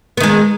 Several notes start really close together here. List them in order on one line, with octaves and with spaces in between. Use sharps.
B3 D#3 G#3